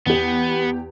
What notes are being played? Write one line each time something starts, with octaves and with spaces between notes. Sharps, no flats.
E2 B3 G4